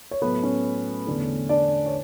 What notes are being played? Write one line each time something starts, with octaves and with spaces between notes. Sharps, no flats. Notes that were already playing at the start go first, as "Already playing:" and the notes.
C#5
A2 F#3 A3 B3 B4
C#4 C#5
E2 D3 A3
D4 D5
C#5